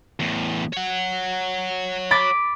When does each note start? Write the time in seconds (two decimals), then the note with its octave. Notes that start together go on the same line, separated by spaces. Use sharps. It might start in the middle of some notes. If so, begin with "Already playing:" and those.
0.20 E2 A2
0.73 C#5 F#5
2.11 B5 D6 A6